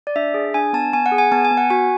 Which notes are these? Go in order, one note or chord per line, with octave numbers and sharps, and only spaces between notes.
D5
D4 E5
G#4
D4 G#5
B3 A5
B3 G#5
F#5
G#4
G#5
B3 A5
G#5
B3
F#5
F#4 G#5